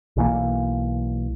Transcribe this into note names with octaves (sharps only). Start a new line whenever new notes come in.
B1 E3 A#3